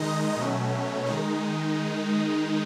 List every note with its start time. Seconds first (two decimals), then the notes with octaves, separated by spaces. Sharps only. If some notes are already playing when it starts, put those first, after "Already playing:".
Already playing: D#3 G#3 D#4 D#5
0.36 B2 F#3 A3 C#4
1.06 D#3 G#3 D#4